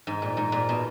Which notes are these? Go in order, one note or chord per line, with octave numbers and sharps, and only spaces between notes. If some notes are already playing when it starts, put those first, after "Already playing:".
G#2
A#2
G#2
A#2
B2